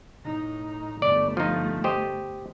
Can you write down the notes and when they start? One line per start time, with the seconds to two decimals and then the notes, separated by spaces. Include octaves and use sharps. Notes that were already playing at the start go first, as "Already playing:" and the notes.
0.23 A2 D#4
1.02 G1 A3 D5
1.37 F3 D#4
1.84 G4 C5 D#5